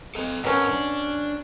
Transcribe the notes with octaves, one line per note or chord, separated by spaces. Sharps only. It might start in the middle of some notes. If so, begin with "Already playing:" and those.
A4 D#5
G#2 B2 F#3 C#4 A#4 A5
D4